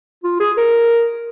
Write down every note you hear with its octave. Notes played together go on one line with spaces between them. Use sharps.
F4
G#4
A#4